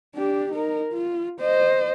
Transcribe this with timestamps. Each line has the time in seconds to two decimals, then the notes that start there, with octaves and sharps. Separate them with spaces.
0.15 D4 G4
0.52 D#4 A#4
0.93 F4
1.41 C5 D#5